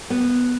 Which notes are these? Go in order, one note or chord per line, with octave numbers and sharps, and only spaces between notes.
B3